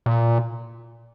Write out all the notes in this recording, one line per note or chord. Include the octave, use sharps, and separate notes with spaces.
A#2